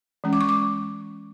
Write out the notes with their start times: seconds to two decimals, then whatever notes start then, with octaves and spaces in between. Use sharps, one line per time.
0.24 E3 G#3 C#4
0.33 D6
0.41 C#6
0.49 D6